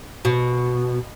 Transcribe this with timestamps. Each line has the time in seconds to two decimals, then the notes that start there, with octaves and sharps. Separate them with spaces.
0.25 B2